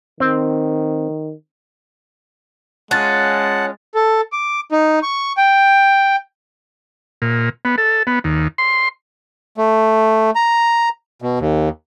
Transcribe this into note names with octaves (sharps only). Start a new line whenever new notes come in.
D#3 C4
G#3 C#4 F4 F#5 A5 F#6 A6
A4
D6
D#4
C#6
G5
A#2
B3
A4
B3
D#2
C6
A3
A#5
B2
D#2